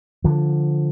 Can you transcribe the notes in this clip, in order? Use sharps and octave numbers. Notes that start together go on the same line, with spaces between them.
D3 F3